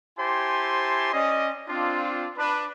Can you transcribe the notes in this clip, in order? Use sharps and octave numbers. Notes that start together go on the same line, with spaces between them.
E4 G4 C5 G#5 A5 C6
C#4 D5 D#5
C4 D4 F4
D4 B4